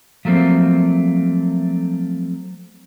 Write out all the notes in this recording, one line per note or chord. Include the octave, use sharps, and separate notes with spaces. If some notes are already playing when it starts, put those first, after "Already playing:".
F3 F#3 A3 A#3 C4